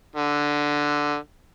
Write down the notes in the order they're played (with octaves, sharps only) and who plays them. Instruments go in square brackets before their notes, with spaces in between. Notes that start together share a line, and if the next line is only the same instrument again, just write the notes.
[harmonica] D3